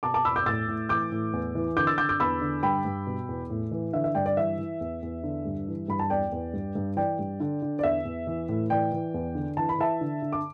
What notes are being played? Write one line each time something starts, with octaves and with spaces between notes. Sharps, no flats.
B2 A5 D6
A5 D6
E2 B5 E6
D6 G6
A2 E6 A6
A2
E3 D6 G6
A2
E2
E3
D3 D6 G6
E6 A6
D3 D6 G6
D6 G6
E2 B5 E6
D3
G2 G5 B5
G2
B2
E2
A2
E3
D3 E5
E5
G2 D5 G5
D5
E3 E5
E3
E2
E2
D3
G2
E3
G2 B5
A5
E2 D5 G5
E2
G2
G2
E3 D5 G5
G2
D3
D3
D5
E2 E5
E2
E3
A2
E3 D5 G5
E3
E2
D3
E3 A5
B5
E3 E5 A5
D3
D3
D6